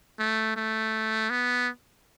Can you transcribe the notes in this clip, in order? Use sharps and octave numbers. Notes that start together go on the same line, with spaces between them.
A3
A3
B3